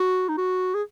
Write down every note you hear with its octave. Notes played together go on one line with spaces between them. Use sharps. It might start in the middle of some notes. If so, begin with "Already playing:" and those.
Already playing: F#4
D#4
F#4
G#4